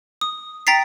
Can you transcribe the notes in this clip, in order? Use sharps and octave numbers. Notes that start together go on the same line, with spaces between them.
D#6
G5 A#5 A6 B6 C7